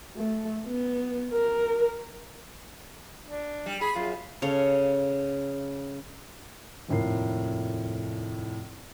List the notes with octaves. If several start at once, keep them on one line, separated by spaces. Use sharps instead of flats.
A3
B3
A#4
D4
G3
G#4 B5
F#2 F4
C#3 A4 C#5 F5
F1 D#2 A2 F4 A#4 C7